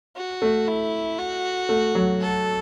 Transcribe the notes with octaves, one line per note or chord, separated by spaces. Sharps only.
F#4
A3
E4
F#4
A3
F#3
A4